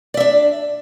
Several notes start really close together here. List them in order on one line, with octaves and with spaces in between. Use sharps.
D5 E5 D4